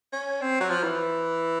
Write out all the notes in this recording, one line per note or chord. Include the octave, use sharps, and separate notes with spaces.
C#4
C4
F#3
F3
E3